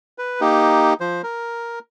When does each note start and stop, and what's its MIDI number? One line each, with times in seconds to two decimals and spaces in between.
0.18 0.41 71
0.41 0.93 58
0.41 0.93 63
0.41 0.93 67
1.00 1.22 53
1.00 1.22 72
1.24 1.79 70